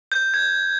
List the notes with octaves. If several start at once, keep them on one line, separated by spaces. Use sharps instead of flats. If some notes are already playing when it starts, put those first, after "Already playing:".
G6
G#6